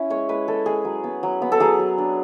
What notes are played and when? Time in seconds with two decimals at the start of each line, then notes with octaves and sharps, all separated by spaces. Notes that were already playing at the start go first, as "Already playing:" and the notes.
Already playing: C#4 E4
0.10 G#3 C#5
0.29 G#3 B4
0.47 G#3 A4
0.66 G#3 G#4
0.85 F#3
1.04 B3
1.23 F#3
1.42 B3
1.52 A4
1.60 F#3 G#4
1.79 F#3
1.98 D4